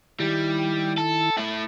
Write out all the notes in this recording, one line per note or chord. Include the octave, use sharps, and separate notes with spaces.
D#3 G3 E4
A4
A3 E4